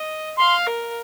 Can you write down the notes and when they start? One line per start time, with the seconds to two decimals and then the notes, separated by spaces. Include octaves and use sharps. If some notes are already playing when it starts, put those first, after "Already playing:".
Already playing: D#5
0.37 F5 C6
0.67 A#4